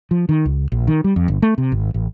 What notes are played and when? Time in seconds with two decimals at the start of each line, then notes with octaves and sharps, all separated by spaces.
0.11 F3
0.29 D#3
0.46 C#2
0.72 A#1
0.87 D#3
1.04 G3
1.16 F2
1.28 G1
1.42 A3
1.58 C3
1.72 G#1
1.94 A1